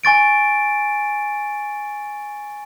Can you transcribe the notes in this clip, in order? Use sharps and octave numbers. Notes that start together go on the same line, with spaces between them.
G#5 C#6 A6 D7